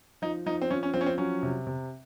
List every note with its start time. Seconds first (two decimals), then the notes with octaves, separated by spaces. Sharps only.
0.22 F3 D#4
0.46 F3 D#4
0.62 C4
0.70 F3 C#4
0.83 C#4
0.94 F3 C4
1.01 C#4
1.06 C4
1.18 F#3 C#4
1.43 C3
1.67 C3